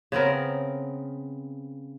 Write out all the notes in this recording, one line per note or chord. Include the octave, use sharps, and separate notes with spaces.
C#3 B3 C4 A#4